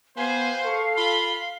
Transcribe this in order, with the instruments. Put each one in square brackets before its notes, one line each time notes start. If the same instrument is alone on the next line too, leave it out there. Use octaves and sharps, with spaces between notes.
[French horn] B3 [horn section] G4 B4 C5 [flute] F5 [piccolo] G#5
[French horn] A4 [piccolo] C#6
[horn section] F4 B5 [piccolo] G7